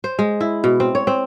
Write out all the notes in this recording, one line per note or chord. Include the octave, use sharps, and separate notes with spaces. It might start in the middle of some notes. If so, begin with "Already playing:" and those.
C5
G#3
E4
B2
C4
C#5
C4